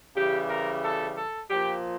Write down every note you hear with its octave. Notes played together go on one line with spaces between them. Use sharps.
C#3 E3 G3 G4
A#4
A4
A4
A#2 F3 G4